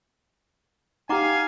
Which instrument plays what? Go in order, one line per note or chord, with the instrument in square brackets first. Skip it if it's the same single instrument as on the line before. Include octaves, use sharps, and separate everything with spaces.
[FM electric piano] D#4 G4 [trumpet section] F5 G#5 [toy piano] F#5 A#5 D6